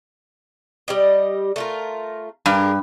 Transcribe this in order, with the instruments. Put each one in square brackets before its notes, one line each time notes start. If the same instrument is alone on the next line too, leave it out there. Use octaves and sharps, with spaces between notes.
[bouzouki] G3 G4 D#5
A3 F4 A#4
[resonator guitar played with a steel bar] G2 [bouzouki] G4 G#4 A#4